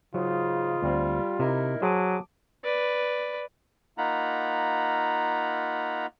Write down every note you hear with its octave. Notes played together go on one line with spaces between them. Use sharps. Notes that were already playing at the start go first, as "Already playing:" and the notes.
G#2 C#3 F#3 F4
D2 G3 C4
C3 D#4 E4 A#4
F#3 G#4 C5 A5 D6 D#6
B4 D5
A#3 D#4 F4 F#5 A#5 B5